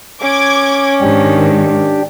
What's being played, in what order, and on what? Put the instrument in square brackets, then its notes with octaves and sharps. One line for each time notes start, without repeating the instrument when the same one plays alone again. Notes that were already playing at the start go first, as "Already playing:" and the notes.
[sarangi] C#4 [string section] D6 G#6
[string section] G#2 D#3 [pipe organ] D4 G4